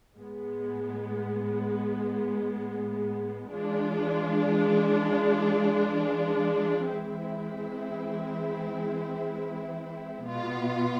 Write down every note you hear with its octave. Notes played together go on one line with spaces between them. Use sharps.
A2 G#3 B3
E3 G#3 D4 F4
E3 G#3 C4 E4
B2 B3 F4